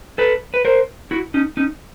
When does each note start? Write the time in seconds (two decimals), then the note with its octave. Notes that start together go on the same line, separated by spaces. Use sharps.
0.18 A4 B4
0.54 B4
0.65 A#4 C5
1.11 E4 F#4
1.34 C#4 D#4
1.57 C#4 D#4